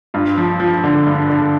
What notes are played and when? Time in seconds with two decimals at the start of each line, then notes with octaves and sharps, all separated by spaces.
0.14 G2 F4
0.38 F3
0.60 F3
0.84 D3
1.07 G2
1.30 D3